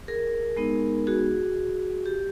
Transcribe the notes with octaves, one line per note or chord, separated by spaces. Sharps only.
G#4 A#4
G#3 B3 D#4
F#4 G#4
G4